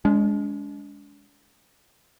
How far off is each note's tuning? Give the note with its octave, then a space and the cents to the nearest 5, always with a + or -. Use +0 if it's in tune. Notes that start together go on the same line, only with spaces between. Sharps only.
G#3 +0 D4 -45